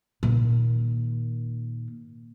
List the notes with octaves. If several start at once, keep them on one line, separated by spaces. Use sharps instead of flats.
A#2 D#3